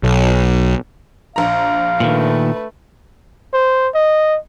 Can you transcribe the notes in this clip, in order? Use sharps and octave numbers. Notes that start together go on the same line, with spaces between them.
B1
A#1 F5 A#5
A#2 D#3 A3 B4
C5
D#5